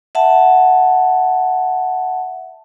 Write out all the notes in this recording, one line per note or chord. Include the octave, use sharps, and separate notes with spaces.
E5 F#5 A5